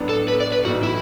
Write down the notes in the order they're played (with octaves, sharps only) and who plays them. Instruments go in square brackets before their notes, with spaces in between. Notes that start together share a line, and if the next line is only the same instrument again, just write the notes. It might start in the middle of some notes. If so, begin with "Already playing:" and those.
Already playing: [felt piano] A2 F#3 B3 D4
[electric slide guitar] A4
B4
D5
B4
[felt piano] B1 A2 E3 [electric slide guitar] F#4
[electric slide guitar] E4